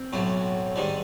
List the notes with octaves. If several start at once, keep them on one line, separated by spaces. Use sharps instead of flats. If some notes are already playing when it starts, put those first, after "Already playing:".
Already playing: C4
B1 A2 F#3
G#2 D#3 G3